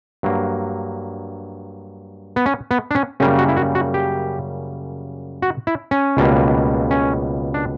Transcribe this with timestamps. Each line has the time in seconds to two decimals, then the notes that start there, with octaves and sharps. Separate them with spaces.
0.23 G2 F#3 A#3
2.36 B3
2.46 C#4
2.71 B3
2.91 D4
2.95 C#4
3.20 F#2 C#3 G3 A#3 C#4
3.38 F#4
3.49 E4
3.57 F#4
3.75 F#4
3.94 G4
5.42 F#4
5.67 E4
5.91 C#4
6.17 C#2 B2 G3 A#3
6.91 C#4
7.54 D4